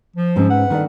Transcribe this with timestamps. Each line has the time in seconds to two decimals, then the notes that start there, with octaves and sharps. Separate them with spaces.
0.17 F3
0.36 G#2 C4 C#4
0.51 B4 F#5
0.70 D#3 A3 D4